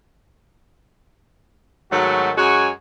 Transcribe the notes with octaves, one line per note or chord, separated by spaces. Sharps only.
G#2 D#3 F#3 A3 F#4
F#2 G#3 F#4 C#5 G#5